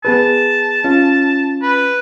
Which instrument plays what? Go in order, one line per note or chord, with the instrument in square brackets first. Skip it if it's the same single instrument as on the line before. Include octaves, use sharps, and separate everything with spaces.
[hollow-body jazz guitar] B3 G#4 B4 [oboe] A5
[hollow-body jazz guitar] C#4 F4
[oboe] B4